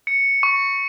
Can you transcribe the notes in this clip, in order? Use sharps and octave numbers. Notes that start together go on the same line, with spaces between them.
C#7
C#6